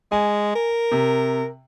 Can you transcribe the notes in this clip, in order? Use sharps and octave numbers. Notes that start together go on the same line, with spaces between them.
G#3 G#5
A#4
C3